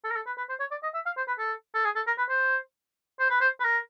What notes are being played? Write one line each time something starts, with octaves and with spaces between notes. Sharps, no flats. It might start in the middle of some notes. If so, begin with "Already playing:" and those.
A4
A#4
A4
B4
B4
C5
C#5
D5
D#5
E5
F5
C5
B4
A4
A4
G#4
A4
A#4
B4
C5
C5
B4
C5
B4
A#4